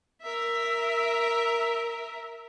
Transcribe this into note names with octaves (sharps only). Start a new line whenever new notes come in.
A#4 E5